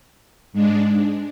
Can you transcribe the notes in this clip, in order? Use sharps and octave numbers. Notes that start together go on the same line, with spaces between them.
G#2 G#3 D4